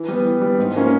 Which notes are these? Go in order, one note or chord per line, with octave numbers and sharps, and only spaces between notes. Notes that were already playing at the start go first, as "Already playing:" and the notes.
Already playing: E3
G3 B3
E3
G3 B3
G#2
F3 A#3 C#4